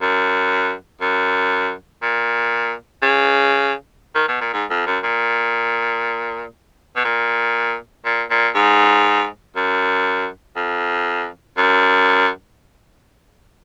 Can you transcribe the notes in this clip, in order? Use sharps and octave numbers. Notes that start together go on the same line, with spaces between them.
F#2
F#2
A#2
C#3
D#3
B2
A#2
G#2
F2
F#2
A#2
B2
A#2
A#2
A#2
G#2
F#2
F2
F#2